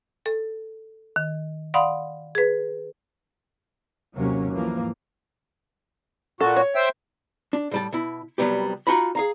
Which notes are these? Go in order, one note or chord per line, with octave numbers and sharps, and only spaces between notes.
A4
D#3
D5 F5 F#5 B5 C6 D#6
G#4 B4
D#2 G#2 C3 F#3 A#3 C#4
G#2 E3 F3 A#3
A#2 F#4 A4
C#5
C5 E5 G5
D4
A2 G3 A5
B2 E4
C2 F#3 G3 B3 G4
D#4 F4 F#4 G#5 A#5 B5
G#4 F5 A#5